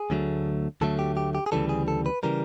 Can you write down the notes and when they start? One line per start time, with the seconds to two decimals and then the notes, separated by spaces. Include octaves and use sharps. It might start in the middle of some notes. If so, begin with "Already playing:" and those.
Already playing: G#4
0.10 D2 D3 F#3 A3
0.81 D2 D3 F#3 A3 A4
0.99 G4
1.17 G4
1.35 G4
1.46 G#4
1.52 D2 C#3 E3 G3 A4
1.69 G#4
1.88 A4
2.06 B4
2.23 C#3 E3 G3 A#4